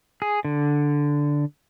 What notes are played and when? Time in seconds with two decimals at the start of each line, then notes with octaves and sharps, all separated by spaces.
0.22 G#4
0.45 D3